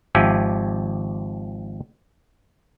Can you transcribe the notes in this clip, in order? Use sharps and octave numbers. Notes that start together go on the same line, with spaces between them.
G#1 F3 G4 E5 G#5